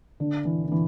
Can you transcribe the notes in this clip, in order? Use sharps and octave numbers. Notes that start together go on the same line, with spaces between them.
D3
E3
D3
E3